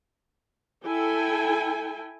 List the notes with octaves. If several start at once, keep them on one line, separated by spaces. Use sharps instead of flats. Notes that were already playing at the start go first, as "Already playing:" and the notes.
E4 A4 G5 G#5